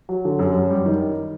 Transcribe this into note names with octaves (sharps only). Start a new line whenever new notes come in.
F#3
D3
F#2
F#2
G3
D#3